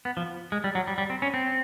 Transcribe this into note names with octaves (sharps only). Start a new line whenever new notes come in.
B3
F3
G#3
G3
F#3
G3
G3
C4
C#4
C4